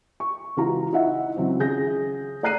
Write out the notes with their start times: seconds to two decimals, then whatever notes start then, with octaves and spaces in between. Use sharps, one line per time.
0.20 C#6
0.57 C#2 E3 F4 F#4 A#5
0.93 D#4 E4 E5 F#5
1.36 C#2 F#3 C4
1.59 C#3 G#4 G6 A#6
2.43 A3 D5 A#5 F#6 C7 D#7